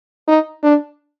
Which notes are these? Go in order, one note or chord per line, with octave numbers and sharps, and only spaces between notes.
D#4
D4